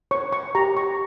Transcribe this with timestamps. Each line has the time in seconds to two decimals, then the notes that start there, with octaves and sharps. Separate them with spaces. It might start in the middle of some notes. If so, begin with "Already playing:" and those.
0.11 C#5 C#6
0.32 C#6
0.55 G4 A#5
0.77 C#6